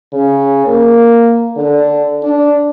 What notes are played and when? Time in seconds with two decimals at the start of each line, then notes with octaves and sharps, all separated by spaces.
0.13 C#3
0.67 A#3
1.57 D3
2.23 D4